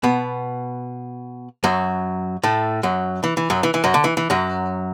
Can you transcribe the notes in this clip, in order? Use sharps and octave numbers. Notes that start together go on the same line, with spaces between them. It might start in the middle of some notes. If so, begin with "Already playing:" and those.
B2 B3
F#2 F#3
A2 A3
F#2 F#3
E3
E3
F#2 F#3
E3
E3
F#2 F#3
D3
E3
E3
F#2 F#3